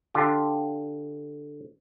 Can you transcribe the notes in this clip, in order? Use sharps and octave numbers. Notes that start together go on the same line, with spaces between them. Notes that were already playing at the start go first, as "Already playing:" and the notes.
D3 F4 G4